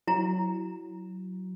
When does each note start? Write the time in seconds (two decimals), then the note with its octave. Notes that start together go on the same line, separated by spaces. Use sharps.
0.07 F#3 E4 A#5